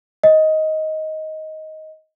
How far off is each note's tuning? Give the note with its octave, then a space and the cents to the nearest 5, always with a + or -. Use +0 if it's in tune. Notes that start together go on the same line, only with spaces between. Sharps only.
D#5 +10